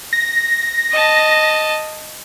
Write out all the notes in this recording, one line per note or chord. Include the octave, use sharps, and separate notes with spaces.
A#6
D#5 A5